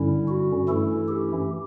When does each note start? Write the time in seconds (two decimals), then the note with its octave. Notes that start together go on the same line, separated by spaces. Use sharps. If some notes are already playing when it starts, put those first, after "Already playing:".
Already playing: G2 D3 G3 C#4 E4
0.28 F#4
0.67 G2 E3 A3 C#4 E4 A4
1.08 G4